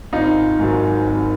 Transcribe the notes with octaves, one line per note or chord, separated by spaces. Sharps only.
G#1 D#4 F4
G#2 D#3 F#3
G#1